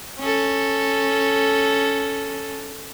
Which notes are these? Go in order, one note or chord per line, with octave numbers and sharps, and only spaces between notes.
C#4 A4